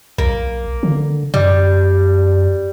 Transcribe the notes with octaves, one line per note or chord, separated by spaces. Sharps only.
B1 A#3
D3
F#2 G3